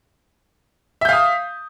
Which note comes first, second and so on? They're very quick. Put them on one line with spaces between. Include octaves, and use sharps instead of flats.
E5 G6 F5 D#6